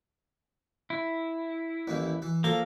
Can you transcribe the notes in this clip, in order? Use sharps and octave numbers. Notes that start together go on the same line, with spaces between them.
E4
A1 D#2 E3
E3
F3 A#3 A4